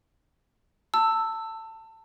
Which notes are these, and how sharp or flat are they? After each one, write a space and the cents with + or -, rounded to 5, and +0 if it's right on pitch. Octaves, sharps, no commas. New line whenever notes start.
A5 +25 E6 +0